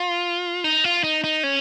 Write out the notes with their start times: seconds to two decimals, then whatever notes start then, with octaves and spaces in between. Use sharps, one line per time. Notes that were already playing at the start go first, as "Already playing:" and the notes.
Already playing: F4
0.64 D#4
0.84 F4
1.04 D#4
1.24 D#4
1.43 C#4